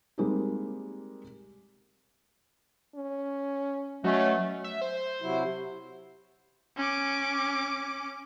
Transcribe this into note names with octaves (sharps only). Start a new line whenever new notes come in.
G3 G#3 A#3 C4 D#4 G4
C#4
B2 F#3 A3 C#4
E5
C5
C3 F#3 E4
C#4 D6